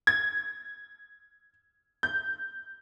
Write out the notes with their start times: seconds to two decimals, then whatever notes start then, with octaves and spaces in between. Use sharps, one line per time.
0.07 G#6
2.03 G6